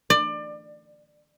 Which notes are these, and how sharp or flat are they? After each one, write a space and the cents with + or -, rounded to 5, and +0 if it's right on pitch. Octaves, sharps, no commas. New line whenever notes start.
D5 +25